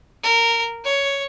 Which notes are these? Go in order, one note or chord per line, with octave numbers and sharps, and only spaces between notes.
A#4
C#5